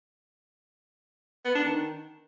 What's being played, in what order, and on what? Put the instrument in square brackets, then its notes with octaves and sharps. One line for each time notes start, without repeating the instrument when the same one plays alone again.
[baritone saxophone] B3
D4
D#3